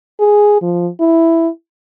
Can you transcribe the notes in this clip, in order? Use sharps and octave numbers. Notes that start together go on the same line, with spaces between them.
G#4
F3
E4